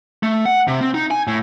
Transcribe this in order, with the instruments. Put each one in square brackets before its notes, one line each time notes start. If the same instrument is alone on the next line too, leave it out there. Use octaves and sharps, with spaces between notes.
[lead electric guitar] A3
F#5
C3
C4
D#4
G#5
A2